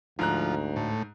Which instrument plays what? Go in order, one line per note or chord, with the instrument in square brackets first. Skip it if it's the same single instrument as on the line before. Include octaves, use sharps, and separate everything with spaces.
[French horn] D2 [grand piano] G#2 A#5 F#6 [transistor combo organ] F3
[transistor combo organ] A2